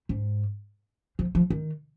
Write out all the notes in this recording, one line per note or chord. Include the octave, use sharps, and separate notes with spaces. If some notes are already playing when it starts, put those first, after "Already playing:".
G#2
F3
F3
D#3